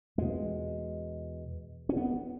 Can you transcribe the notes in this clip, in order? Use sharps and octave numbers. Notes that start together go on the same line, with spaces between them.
E2 B2 G#3
C#4
B3